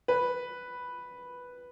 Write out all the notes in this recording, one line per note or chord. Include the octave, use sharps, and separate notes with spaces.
B4